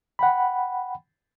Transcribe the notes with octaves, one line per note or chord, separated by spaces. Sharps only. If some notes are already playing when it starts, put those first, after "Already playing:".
F#5 G5 B5